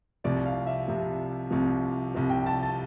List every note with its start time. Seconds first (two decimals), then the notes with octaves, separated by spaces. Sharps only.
0.24 C2 C3 F3 D5
0.46 F5
0.66 E5
0.88 C2 C3 F3
1.51 C2 C3 F3
2.15 C2 C3 F3
2.30 G5
2.46 A5
2.62 A5